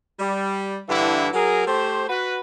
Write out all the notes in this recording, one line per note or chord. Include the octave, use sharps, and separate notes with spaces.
G3
G2 D3 E3 E4
F#3 G#4 A#4
A3 G4 C5
F#4 B4